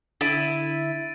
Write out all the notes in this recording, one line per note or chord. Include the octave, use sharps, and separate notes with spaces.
D3 E4 A6 D7 D#7